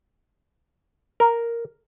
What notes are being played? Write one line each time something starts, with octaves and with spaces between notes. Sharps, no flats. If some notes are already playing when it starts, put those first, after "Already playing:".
A#4